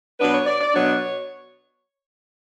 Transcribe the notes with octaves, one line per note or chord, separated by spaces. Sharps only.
B2 F#3 B3 D4 B4
C#5
D5
D5
B2 F#3 B3 D4 C#5